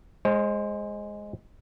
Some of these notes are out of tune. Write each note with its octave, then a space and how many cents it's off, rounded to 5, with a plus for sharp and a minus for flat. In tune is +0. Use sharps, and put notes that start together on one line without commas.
G#3 +0 C5 +30